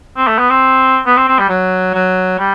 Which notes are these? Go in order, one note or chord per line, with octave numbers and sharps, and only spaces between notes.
C4
A3
B3
C4
B3
C4
C4
G3
F#3
F#3
G3